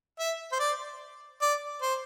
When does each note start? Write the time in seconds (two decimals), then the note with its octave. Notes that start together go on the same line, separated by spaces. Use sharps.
0.19 E5
0.52 C5
0.59 D5
1.41 D5
1.82 C5